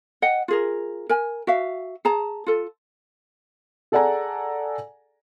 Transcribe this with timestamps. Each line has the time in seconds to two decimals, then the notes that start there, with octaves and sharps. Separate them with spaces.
0.22 D#5 F#5 G5
0.48 F4 G#4 A#4
1.09 A#4 G#5
1.47 F#4 E5 F5
2.05 G#4 A5 A#5
2.46 F4 A4
3.92 G#4 A4 D5 F#5 G#5 A#5